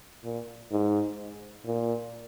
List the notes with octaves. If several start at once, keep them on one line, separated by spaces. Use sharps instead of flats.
A#2
G#2
A#2